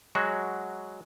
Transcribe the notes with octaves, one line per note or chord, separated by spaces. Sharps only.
F#3 G#3 F#4